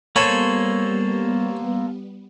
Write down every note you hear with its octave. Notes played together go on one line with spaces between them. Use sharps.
G3 A#3 B3 A4 C5 C#5 G#5 B5